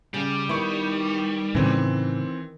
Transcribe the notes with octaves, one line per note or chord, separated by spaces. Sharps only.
C#3 G3
D#3 B3 D#4 E4 C#6
A2 C#3 E3 C4